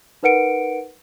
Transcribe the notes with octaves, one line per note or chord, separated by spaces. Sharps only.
D#4 A#4 B4 F#5 C#7 D7